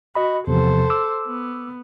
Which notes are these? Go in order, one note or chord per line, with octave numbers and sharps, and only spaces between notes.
F#4 D#5 B5
E2 C3 F3 A4 C5
D6 E6
B3